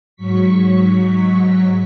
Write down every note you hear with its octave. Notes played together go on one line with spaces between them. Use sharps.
G#2 F#3 C#6 B6